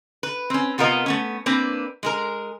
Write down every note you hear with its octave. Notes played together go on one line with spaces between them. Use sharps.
B4
C4 C#4
C3 B3 F4 A#4 D#5
A3 B3 C#4
A#3 C4 D4 B4
G#3 G#4 A#4